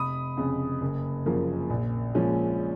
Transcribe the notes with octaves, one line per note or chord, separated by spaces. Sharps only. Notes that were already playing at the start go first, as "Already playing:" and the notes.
Already playing: F1 B5 D#6
F2 C#3
F#1
F#2 C#3 F3 A#3
A#1
A#2 F3 G#3 C#4